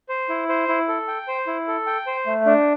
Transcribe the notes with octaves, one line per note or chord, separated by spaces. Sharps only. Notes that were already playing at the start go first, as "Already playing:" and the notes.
C5
E4
C5
E4
A4
G5
C5
E4
A4
G5
C5
A3
D4